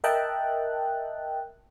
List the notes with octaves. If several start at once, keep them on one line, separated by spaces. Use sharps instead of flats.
A#4 D#5 E5 G5 A5 F#6